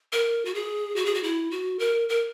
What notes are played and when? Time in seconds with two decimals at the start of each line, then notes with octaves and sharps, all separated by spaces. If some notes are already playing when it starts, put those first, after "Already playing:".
0.12 A#4
0.45 F#4
0.55 G#4
0.96 F#4
1.06 G#4
1.15 F#4
1.23 E4
1.51 F#4
1.79 A#4
2.09 A#4